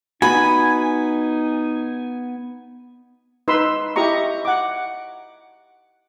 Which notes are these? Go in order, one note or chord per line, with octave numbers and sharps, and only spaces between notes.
B3 D#4 F#4 G#5 B5
D#4 B4 B5 C6 E6
E4 G4 D#5 A#5 C#6
F#5 D6